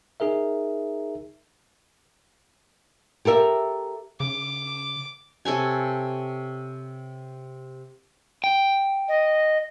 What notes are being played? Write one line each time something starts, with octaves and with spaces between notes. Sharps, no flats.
D#4 G#4 A#4 E5
G4 A4 A#4 E5
C#3 D6
C3 A4 C#5 G#5
G5
D#5